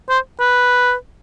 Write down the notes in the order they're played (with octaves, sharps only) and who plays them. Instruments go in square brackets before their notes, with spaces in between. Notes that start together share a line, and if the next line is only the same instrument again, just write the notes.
[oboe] C5
B4